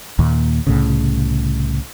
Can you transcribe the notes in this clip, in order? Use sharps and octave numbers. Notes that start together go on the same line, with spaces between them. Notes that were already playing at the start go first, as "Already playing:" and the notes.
D#2 A#2
C2 A2 C#3